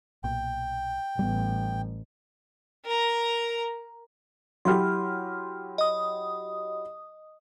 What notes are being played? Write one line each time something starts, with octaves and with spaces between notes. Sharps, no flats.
B1 A#2 G5
A1 G3 A3 B3
A#4 A#5
F#3 E4 G4 C6 F6
D#5 D#6